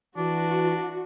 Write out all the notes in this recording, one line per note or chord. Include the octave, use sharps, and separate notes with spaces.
E3 D4 F#4